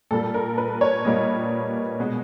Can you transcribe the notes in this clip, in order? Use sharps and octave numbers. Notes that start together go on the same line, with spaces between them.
A#2 G3 A#3 A4
A#4
B4
C#5
A#2 G3 A#3 D#5
B2 G#3